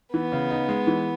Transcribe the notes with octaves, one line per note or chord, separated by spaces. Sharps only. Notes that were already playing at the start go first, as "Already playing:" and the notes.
E3 B3
C#3
D#4
G#3
E3